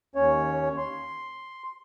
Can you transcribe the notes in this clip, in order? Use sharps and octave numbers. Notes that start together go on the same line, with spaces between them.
D#2 C#4 C#5
C6